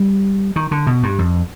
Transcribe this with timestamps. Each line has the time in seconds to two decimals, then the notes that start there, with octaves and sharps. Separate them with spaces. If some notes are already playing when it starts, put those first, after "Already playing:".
Already playing: G3
0.56 D#3
0.71 D3
0.87 B2
1.03 G2
1.19 F2